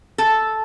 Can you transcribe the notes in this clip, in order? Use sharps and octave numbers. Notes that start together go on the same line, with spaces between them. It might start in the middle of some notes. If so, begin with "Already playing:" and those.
A4